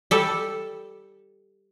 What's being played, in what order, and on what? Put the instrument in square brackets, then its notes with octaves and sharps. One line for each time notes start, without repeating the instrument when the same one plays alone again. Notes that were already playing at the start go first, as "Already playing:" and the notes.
[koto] G3 A4